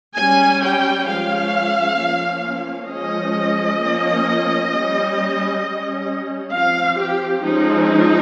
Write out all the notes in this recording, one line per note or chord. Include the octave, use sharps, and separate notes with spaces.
G3 C#4 G#5
G5
F3 G#3 C#4 F5
F3 A#3 C#4
F3 G#3 C#4 D#5
F3 A#3 C#4
G3 C#4
G3 C#4
F3 C4 F5
G4
F3 G#3 C#4 D#4